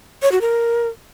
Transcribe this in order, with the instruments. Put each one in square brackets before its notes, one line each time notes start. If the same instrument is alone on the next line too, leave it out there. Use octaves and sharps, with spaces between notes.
[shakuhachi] C#5
F#4
A#4